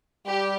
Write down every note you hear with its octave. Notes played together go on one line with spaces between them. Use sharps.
G3 G4